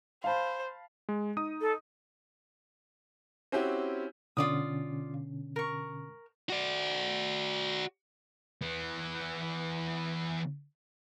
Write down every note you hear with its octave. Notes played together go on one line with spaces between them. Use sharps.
C5 F5 A5 B5
G#3
D#4 D#6 D#7
A4
C4 C#4 E4 F#4 G4
B2 D3 C#4 F4 D5 D#6
A#4 C#6
F#4 D5
E3 B3